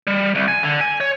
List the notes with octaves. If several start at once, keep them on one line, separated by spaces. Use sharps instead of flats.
G3
C2
G#5
D3
G#5
C#5